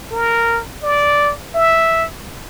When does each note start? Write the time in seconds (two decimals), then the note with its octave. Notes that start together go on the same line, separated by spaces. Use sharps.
0.11 A#4
0.83 D5
1.55 E5